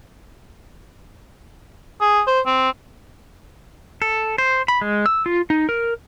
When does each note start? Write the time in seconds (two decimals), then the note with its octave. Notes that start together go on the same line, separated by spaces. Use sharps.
2.01 G#4
2.27 C5
2.46 C4
4.02 A4
4.38 C5
4.68 B5
4.81 G#3
5.06 E6
5.26 F4
5.50 D#4
5.69 A#4